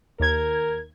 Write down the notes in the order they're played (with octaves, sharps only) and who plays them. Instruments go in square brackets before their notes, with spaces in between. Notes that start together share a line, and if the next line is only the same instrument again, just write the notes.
[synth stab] D#2 G#6 [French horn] A#4